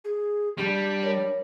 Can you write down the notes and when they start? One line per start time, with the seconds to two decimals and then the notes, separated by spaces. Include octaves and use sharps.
0.05 G#4
0.58 G3 D4
1.03 A#4 C#5